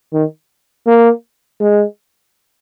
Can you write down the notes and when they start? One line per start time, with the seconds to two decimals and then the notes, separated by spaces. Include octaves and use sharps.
0.13 D#3
0.87 A#3
1.61 G#3